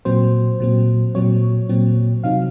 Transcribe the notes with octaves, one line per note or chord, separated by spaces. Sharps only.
A#2 F#3 C4 C5
A#2 F#3 C4
A#2 F#3 C4 C#5
A#2 F#3 C4
C3 F#3 C4 D#4 F5